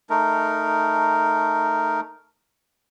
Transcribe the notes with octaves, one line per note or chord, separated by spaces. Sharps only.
A3 D#4 A#4